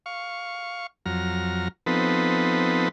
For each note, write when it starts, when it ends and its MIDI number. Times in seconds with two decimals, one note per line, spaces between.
0.06 0.87 77
0.06 0.87 85
1.06 1.68 41
1.06 1.68 54
1.06 1.68 82
1.06 1.68 89
1.86 2.88 53
1.86 2.88 59
1.86 2.88 60
1.86 2.88 63
1.86 2.88 69
1.86 2.88 71